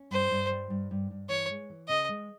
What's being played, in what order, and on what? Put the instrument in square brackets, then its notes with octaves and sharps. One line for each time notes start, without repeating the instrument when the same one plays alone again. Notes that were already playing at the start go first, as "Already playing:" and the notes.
Already playing: [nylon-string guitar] C#4
[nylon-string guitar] G2 [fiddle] C5
[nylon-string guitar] G2
G3
G2
G2
G2
[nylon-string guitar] E3 [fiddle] C#5
[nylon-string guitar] G#3
E3
[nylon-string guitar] C#3 [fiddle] D#5
[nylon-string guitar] G#3